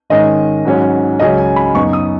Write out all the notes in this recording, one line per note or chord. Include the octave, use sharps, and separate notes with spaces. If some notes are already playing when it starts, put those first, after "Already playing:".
G#2 D#3 G#3 C#4 D#5
G#2 F#3 C#4
C#2 C#3 F#3 C#4 D#5
G#5
B5
F#2 C#3 B3 D#4 C#6
D#6